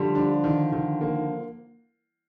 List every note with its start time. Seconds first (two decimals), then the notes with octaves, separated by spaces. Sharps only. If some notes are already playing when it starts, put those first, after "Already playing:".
Already playing: D3 F3 G3
0.15 D4
0.44 D#3
0.72 D#3
1.01 A#3